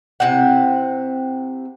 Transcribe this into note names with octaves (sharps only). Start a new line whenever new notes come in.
C3 C4 E4 F#5